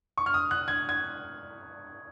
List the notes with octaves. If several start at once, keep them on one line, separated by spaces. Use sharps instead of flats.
C#6
F6
D#6
F#6
G#6
G#6